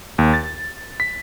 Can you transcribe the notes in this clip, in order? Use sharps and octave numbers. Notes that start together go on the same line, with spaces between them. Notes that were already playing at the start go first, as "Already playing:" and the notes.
D#2
A6
B6